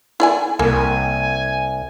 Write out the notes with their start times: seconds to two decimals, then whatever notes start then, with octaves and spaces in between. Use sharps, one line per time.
0.20 E4 D5 G#5
0.59 C2 A#3 G#5